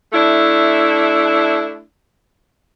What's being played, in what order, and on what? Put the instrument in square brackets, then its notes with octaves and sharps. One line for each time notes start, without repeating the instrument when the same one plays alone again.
[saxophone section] A3 D4 E4